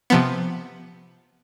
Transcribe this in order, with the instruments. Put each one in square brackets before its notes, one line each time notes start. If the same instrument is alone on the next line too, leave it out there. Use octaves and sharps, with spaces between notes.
[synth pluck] C3 F3 B3